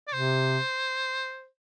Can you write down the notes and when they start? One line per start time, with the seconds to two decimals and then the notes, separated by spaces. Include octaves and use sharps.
0.08 D5
0.13 C3 C5